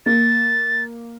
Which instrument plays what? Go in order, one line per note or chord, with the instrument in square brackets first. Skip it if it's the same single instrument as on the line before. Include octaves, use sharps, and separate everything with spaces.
[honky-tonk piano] A#3 [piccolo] A6